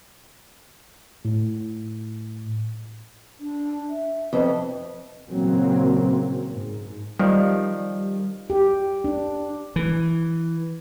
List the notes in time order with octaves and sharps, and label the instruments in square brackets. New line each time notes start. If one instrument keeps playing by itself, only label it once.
[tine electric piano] A2
[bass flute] D4
E5
[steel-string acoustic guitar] F2 [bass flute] B4
[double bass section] A#2 C#3 E3 F#3 A#3 C4
G#2
[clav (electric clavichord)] D#3 F3 [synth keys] G3
[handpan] G4
D4
[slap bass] E3